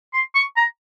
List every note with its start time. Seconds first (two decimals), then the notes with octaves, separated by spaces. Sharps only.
0.13 C6
0.35 C#6
0.56 A#5